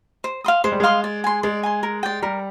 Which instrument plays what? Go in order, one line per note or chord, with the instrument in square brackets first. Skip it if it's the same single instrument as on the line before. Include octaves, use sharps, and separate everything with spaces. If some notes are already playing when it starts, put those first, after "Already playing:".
[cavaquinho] C5
F5 C6 D#6
[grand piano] G#3 [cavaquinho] C5
[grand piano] G3
[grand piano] G#3 [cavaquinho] F5 C6 D#6
[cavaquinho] D5
G#5 C6
[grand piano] G#3 [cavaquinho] D5
[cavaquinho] G#5 C6
A#4
D5 G5
[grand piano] G3 [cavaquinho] A#4